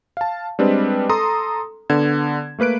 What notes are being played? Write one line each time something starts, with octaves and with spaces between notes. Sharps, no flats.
F5 A5
G3 G#3 C4 D4 B4 D#5
A4 A#5 C6 D#6
D3 B3 G#6 E7
A3 A#3 B4 F#6 D7